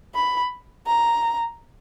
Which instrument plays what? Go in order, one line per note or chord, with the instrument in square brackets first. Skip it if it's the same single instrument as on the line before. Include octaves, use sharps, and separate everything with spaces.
[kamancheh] B5
A#5